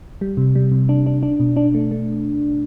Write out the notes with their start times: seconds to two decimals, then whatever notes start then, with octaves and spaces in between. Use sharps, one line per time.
0.21 G3
0.37 C3
0.55 G3
0.72 C3
0.89 D4
1.06 D4
1.23 D4
1.40 B2
1.56 D4
1.74 A3
1.91 A3